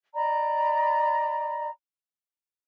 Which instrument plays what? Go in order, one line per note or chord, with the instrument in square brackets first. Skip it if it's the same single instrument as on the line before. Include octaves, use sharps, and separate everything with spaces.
[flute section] D5 D#5 A#5 B5